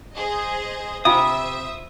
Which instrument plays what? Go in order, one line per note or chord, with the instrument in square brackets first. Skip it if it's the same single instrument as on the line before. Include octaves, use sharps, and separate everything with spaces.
[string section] G#4 C5 D#5
[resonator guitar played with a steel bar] C3 [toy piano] F4 F5 [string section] C5 E5 [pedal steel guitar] D#6